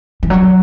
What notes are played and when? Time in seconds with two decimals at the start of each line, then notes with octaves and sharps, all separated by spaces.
0.23 E3
0.30 F#3